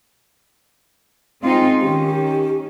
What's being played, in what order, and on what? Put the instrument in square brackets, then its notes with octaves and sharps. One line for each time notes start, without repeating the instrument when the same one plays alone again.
[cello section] G#3 D#4 F4 [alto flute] C4
[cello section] D#3 C#4 [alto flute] G4